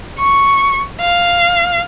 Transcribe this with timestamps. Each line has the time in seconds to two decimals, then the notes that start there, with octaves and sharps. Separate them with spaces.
0.19 C#6
1.01 F5